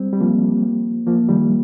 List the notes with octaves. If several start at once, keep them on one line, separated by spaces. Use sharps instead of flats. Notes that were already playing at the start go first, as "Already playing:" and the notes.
Already playing: G3 C4
G3
F3 A#3
F3 A#3
D#3 G3